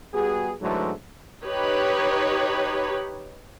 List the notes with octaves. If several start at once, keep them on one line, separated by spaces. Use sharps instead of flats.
G3 B3 F#4 G#4
G#2 D3 E3 F#3 A3
D#4 G4 B4 C#5